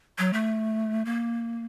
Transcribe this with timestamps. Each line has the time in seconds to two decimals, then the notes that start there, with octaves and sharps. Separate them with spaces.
0.18 F#3
0.33 A3
1.05 A#3